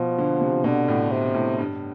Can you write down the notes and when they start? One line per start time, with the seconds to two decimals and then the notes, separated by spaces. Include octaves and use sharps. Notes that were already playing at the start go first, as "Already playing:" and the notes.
Already playing: B2 F3
0.18 D3
0.41 C3
0.64 B2 D3
0.88 A2
1.11 C3
1.34 A2
1.58 G2